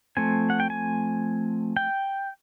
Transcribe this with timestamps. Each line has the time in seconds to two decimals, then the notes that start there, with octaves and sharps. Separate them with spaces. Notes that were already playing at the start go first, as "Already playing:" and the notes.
0.17 F3 A3 C4 G#5
0.50 F#5
0.60 G5
0.70 G#5
1.77 G5